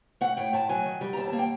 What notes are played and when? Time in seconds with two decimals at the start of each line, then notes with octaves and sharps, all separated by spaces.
0.21 A3 F#5
0.37 A2 G5
0.53 A2 A5
0.69 F#3 G#5
0.85 D#3
1.01 G3
1.13 A#5
1.17 D#2 A5
1.27 A5
1.32 A#3
1.39 G5